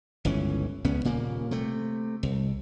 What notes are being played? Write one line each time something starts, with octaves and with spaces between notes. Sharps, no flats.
G1 C#2 E3 C#4
C#2 B3 C#4
D#1 A#2 C#3 A#3
C3 A3
C2